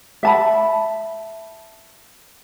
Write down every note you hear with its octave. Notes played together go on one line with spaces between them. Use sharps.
E5 A5 B5